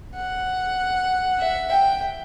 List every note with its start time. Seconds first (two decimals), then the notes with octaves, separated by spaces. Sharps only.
0.16 F#5
1.39 E5
1.70 G5